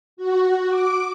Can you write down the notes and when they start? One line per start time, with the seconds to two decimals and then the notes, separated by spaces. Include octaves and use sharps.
0.17 F#4
0.69 D6